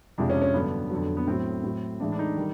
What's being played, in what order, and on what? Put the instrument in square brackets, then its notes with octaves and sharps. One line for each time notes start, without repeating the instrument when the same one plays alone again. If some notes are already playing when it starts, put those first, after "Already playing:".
[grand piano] F2 C3 F3 G#3 D4
C#4
C#4
G2 D3 F#3 B3
F2 D3 F#3
B3
A2 F#3 C4
A2 F#3
A2 E3 G#3 D4
D4
D#4
D#3 G3